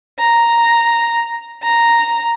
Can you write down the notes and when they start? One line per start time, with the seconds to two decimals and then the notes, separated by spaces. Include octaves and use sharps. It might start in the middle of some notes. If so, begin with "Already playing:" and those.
0.19 A#5
1.63 A#5